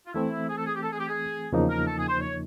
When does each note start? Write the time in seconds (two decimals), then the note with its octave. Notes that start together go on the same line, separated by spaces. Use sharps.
0.07 F4
0.14 E3 A3 C4 E4
0.49 G#4
0.58 A4
0.66 G#4
0.75 G4
0.83 A4
0.92 G#4
0.99 G4
1.08 G#4
1.52 E2 C#3 F3 A#3 D#4
1.69 A#4
1.87 A4
1.98 G#4
2.09 C5
2.20 C#5